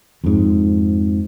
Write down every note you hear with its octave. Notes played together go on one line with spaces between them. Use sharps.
F2 G#2